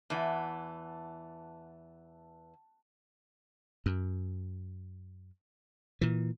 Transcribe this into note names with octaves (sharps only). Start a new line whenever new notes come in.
E2 E3 F#5 A5
F#2
A#2 E3